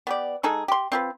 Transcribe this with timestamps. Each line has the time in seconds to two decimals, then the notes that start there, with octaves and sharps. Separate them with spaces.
0.07 B3 G4 D5
0.43 G#3 D#4 G#4 A4
0.68 G4 C6
0.92 C4 F4 B4